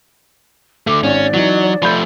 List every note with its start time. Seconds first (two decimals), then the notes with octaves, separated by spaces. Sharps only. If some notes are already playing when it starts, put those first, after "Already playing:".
0.87 D3 A3 D6
1.04 G#1 C#4 D5
1.34 E3 F#3 D#4
1.83 F3 A3 B5 G6